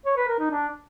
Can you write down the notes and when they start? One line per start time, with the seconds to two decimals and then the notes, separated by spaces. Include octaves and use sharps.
0.06 C#5
0.17 B4
0.28 A#4
0.40 D#4
0.51 D4